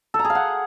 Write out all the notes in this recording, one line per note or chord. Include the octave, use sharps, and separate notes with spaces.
A4
A#5
G#4
F5
F#5